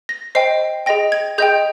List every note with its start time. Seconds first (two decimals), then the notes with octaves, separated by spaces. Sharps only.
0.09 A#6
0.35 C5 D#5 G5 C7
0.86 G#4 D#5 G5 A#6
1.12 G#6
1.38 G#4 D#5 G5 G6